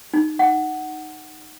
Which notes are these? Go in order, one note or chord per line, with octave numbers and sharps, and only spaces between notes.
D#4
F#5